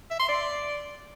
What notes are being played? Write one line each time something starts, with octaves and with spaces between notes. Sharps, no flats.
E5
C6
D5